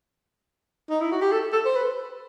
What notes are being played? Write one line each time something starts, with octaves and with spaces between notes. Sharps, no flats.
D#4
E4
F#4
G4
A4
A4
C5
B4